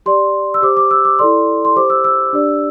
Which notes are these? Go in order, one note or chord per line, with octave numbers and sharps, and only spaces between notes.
G4 D5 C6
E6
G4 C5 D6
D6
E6
D6
E4 A4 D5 C6
C6
G4 C5 D6
E6
E6
D4 G4 D5